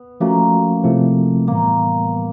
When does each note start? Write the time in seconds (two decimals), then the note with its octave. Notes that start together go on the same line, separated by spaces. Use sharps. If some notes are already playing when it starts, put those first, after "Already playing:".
Already playing: B3
0.20 F3 A3 A#3 C#4 F#4
0.84 C3 F3 A3 C4 E4
1.47 A2 E3 G3 A#3 B3